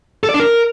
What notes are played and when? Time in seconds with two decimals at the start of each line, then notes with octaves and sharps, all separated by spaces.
0.23 A4
0.29 D5
0.34 D4
0.40 A#4